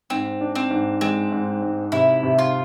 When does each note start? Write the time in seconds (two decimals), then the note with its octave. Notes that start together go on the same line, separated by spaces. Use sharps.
0.10 G#2 C4
0.41 D4
0.55 C4
0.71 G#2
1.01 G#3 C4
1.32 G#2
1.62 G#2
1.92 C3 E4
2.23 C3
2.39 F4